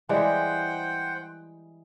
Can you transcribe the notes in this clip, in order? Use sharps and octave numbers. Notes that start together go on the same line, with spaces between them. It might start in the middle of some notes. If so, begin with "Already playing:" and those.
E3 G3 G#3 C5 F#5 G5